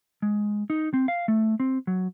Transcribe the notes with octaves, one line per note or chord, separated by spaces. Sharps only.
G#3
D#4
C4
F5
A3
C4
F#3